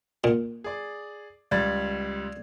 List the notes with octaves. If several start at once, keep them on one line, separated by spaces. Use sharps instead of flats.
A#2
G#4 D5
C#2 G3 D5 G#6 A6